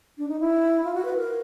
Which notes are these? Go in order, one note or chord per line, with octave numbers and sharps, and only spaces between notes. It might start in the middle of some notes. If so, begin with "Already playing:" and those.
D4
D#4
E4
F4
F#4
B4
A#4